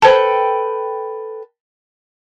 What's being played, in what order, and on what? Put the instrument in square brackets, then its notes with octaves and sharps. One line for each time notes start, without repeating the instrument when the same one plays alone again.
[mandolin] A4 B4 G5 [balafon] C5 A5